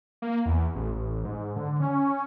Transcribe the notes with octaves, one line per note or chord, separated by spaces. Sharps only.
A#3
E2
A1
A1
G#2
D3
C#4